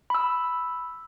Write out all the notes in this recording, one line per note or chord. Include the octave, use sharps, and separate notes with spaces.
B5 E6